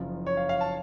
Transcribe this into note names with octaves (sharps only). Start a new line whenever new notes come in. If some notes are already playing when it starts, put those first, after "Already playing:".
Already playing: F#1 F#2 F3
C#5
F5
F5
A5